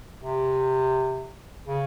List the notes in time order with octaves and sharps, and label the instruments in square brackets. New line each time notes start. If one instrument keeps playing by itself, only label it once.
[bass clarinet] C3
C#3